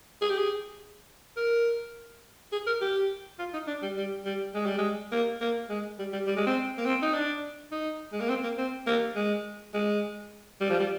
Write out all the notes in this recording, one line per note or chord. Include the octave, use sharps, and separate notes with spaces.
G#4
G4
G#4
A#4
G#4
A#4
G4
F4
D#4
D4
G3
G3
G3
G#3
G3
G#3
A#3
A#3
G#3
G3
G3
G3
G#3
C4
A#3
C4
D#4
D4
D#4
G#3
A#3
C4
A#3
C4
A#3
G#3
G#3
G3
F3
G3